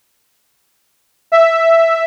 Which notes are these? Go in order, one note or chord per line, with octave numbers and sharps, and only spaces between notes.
E5